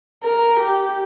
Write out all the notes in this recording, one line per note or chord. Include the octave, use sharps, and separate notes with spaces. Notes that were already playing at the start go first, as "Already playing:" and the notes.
A#4
G4